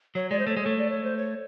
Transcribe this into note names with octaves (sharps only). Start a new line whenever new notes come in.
F#3 C#5
G#3 D5
C5
A3 C#5
G#3
A3 C#5
D5
C#5
C5
C#5